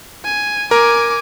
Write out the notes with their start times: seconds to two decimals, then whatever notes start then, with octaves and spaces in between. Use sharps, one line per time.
0.25 G#5
0.71 A#4 G#5 D6